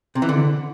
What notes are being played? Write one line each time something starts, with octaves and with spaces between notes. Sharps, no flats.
C3
E3
D3